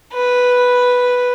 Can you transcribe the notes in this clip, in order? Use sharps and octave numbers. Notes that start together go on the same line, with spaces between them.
B4